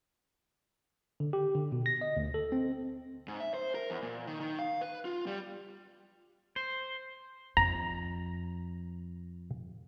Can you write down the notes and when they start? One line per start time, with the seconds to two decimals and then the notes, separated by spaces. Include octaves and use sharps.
1.20 D3
1.33 G4
1.55 D3
1.72 B2
1.86 A#6
2.01 D#5
2.17 D2
2.34 A4
2.52 C4
3.28 G#2
3.40 E5
3.54 C5
3.75 A#4
3.90 E2
4.02 A#2
4.27 D#3
4.40 D#3
4.59 F5
4.81 B4
5.05 F4
5.27 G3
6.56 C5
7.57 F2 A#5